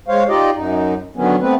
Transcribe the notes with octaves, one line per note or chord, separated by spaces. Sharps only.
G#3 C5 C#5 F5
D#4 F4 G4 D5 D#5
F#2 D#4
D3 D#3 F#3 B3 C#4
A3 B3 C4 B4